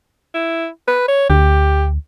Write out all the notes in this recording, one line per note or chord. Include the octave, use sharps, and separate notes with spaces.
E4
B4
C#5
D2 G4